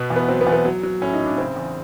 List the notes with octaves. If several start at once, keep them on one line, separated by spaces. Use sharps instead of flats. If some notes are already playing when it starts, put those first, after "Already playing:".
Already playing: B2 B3
E2
B3
F#3 C4
B3
E2
B3
F#3
F#3
A2 C#4
D#4
A2
D4
C#3 C4
E2